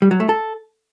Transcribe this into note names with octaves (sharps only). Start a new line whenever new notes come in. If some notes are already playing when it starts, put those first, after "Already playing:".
G3
F#3
A3
A4